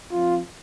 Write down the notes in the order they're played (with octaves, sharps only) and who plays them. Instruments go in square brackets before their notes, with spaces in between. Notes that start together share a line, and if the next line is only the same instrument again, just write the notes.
[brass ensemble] F3 C4 F4